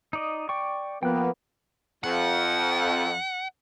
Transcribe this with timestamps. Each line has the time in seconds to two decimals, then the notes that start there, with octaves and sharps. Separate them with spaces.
0.13 D#4 D5 D#5
0.49 D5 G5 C#6
1.03 F3 A#3 B3 G5 F#6
2.04 F2 F#5